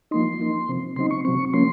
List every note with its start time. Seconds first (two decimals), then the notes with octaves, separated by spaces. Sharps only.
0.11 F3 A#3 D#4 C6
0.39 F3 A#3 D#4
0.68 C3 F3 C4
0.96 C#3 F#3 C4 D#4 C6
1.11 C#6
1.25 C3 F#3 C4 C#6
1.53 F3 A#3 C#4 C6